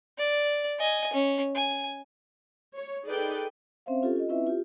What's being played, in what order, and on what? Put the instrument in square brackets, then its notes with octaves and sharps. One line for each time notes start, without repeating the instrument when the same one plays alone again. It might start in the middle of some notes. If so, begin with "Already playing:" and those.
[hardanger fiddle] D5
D#5 G#5
C#4
G#5
[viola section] C#5
D#4 G#4 A4 B4 D5 G5
[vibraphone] C4 C#4 C5 E5 F5
C#4 F4 G4 A4
F4 D#5
C4 C#4 E4 B4 E5
F4 G4